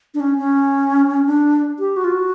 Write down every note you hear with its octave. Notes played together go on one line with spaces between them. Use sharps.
D4
C#4
C#4
D4
G4
F#4
F4
F#4